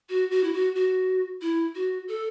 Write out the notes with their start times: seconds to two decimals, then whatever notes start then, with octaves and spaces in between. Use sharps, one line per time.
0.09 F#4
0.31 F#4
0.44 E4
0.53 F#4
0.75 F#4
1.41 E4
1.75 F#4
2.08 A4